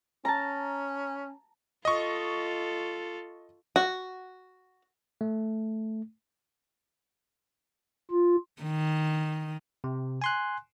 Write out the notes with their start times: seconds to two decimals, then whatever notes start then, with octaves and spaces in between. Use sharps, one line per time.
0.25 C#4 A5 A#5
1.85 F4 A4 D#5 C#6
3.76 F#4
5.21 A3
8.11 F4
8.62 D#3
9.84 C3
10.22 G#5 C6 F#6